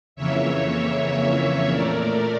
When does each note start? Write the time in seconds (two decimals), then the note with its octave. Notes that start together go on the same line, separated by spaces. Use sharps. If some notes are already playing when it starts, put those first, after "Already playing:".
0.16 F2 C#3 E3 A#3 C#5 E5
1.70 A#2 A3 A#4 D5